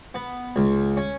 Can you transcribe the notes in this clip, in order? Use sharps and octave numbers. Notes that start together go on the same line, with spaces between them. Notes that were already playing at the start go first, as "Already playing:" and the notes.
B3
C#2
C#4